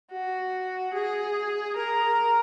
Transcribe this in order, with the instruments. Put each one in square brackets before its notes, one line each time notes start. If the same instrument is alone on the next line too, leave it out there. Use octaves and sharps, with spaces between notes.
[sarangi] F#4
G#4
A#4